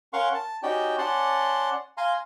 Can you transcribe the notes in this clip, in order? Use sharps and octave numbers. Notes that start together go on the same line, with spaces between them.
C#4 A#4 F5 F#5 C6 C#6
A5
C#4 D#4 F#4 G4 D5 G5
C#4 D5 F#5 A5 C6
F5 G#5 A#5 C6